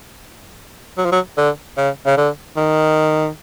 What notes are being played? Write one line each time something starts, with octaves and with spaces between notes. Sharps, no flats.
F#3
F3
F#3
D3
C#3
C#3
D3
D#3